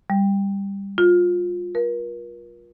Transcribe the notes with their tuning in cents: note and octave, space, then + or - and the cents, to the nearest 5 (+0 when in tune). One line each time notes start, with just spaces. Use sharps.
G3 +15
F4 +20
A#4 +40